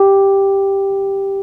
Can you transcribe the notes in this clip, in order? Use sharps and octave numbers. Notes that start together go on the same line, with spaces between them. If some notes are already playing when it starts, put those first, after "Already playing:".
Already playing: G4